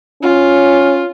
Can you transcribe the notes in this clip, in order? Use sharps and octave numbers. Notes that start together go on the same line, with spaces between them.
C#4 F4